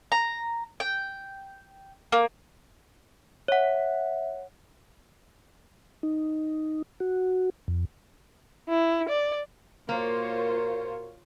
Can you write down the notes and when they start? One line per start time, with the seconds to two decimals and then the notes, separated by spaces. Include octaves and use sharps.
0.12 A#5
0.80 G5
2.12 A#3
3.48 C#5 E5 F#5
6.03 D#4
7.00 F#4
7.68 F2
8.68 E4
9.09 D5
9.89 A#2 A#3 F4 F#4 A#4 C5 C#5